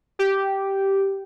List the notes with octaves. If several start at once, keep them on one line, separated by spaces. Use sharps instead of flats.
G4